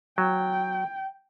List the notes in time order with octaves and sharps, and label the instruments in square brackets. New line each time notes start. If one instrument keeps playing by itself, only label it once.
[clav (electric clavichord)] F#3 [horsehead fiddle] G5